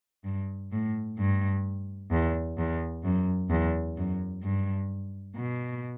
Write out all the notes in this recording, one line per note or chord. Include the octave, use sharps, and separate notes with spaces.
G2
A2
G2
E2
E2
F#2
E2
F#2
G2
B2